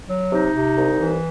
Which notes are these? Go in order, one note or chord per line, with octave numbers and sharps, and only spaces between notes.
F#3
C3 D#4
C3
C2
E3